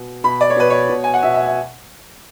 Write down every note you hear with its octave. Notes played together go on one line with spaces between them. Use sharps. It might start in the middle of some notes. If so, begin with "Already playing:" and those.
Already playing: B2
B2 B5
D5
C#5
B2 B4
C#5
B2
G#5
F#5
B2 E5
E5
E5